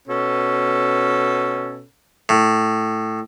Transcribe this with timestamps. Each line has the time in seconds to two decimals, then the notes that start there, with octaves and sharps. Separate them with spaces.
0.08 B2 C#4 A4
2.29 A2